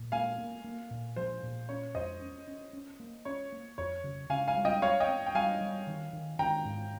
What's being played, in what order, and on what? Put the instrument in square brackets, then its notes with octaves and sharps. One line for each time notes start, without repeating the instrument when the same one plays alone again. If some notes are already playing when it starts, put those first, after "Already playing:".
Already playing: [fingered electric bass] A#2
[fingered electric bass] A#3 [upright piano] F5 G#5
[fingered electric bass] A#3
A#3
A#2
[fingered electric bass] F3 [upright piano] C5
[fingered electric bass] A#2
[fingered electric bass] C#4 [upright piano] C#5
[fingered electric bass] F2 [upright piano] C5 D#5
[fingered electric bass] C#4
C#4
C#4
A#3
[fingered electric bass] C#4 [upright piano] C#5
[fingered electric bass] A#3
[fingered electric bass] F2 [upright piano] C#5
[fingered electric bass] C#3
[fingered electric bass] C#3 [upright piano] F5 G#5
[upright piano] F5 G#5
[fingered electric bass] G3
[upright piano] D#5 G5
[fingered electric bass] C4 [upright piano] C#5 F5
[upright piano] D#5 G5
[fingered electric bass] C4
[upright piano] G5
[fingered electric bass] G3 [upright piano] F5 G#5
[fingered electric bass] G3
D#3
D#3
[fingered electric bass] D#3 [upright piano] G5 A#5
[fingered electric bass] G#2